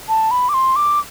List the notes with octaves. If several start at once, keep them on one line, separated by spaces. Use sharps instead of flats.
A5
B5
D6
C6
D6